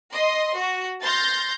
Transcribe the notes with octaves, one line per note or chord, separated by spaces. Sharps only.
D#5 C6
F#4
C6 F6 G6 A6 A#6